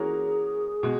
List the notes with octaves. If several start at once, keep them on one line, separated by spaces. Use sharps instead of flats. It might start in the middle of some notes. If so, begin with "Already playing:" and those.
Already playing: E3 A#3 C#4 F#4 G#4 A#4
B2 G#3